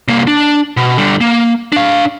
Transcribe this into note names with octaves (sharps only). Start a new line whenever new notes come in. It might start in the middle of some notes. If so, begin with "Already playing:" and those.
C2 A#3
D4
B2
D3 G3
A#3
D4 F5